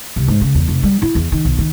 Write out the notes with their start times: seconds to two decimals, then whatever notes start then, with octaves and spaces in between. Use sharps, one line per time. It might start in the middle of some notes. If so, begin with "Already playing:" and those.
0.16 C2
0.28 G#2
0.41 C#3
0.55 E2
0.68 F1
0.83 G3
1.02 E4
1.15 E2
1.32 D#3
1.45 B1
1.58 D#3